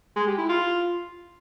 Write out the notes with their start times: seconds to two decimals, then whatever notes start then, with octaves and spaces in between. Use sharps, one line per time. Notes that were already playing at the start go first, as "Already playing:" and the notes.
0.16 G#3
0.27 G4
0.38 E4
0.49 F4